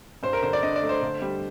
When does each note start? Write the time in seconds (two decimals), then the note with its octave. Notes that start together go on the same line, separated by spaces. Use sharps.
0.23 G2 C5
0.33 A#4
0.43 D3 C5
0.53 D5
0.63 D4 D#5
0.76 D5
0.82 A3
0.89 C5
1.02 D3
1.22 G3